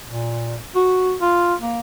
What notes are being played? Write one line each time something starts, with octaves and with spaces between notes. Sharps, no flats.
A#2
F#4
F4
A#3